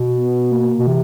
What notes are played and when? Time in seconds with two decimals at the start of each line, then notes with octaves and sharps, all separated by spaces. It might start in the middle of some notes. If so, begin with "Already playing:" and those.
Already playing: B2
0.16 B3
0.52 A#3
0.79 B2
0.87 C3 E3